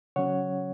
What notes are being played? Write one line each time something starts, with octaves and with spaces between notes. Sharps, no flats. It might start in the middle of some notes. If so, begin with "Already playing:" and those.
C#3 F#3 C#4 C#5 F#5